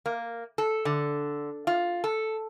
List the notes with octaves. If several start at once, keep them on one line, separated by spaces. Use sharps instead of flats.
A#3
A4
D3
F4
A4